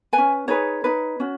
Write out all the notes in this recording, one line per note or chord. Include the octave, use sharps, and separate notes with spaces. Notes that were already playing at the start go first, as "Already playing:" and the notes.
B4 G#5
C#4
D#4 G#4 B4 C#5
D#4 B4
C#4 F#4